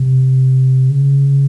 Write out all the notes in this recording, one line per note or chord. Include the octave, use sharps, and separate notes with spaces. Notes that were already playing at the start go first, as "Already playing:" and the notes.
Already playing: C3
C#3